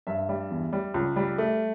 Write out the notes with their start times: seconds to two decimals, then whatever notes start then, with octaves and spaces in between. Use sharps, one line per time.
0.07 G2 E5
0.29 G3
0.51 E2
0.73 G3
0.94 C#2
1.16 G3
1.38 A3